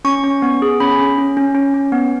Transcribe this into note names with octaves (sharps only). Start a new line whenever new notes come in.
C#4 C#6
C#4
B3
G#4
C#4 B5
C#4
C#4
C#4
C#4
C#4
B3